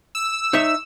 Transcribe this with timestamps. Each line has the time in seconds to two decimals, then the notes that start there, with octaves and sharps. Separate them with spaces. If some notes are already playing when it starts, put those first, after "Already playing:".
0.15 E6
0.53 D#4 C#5 E5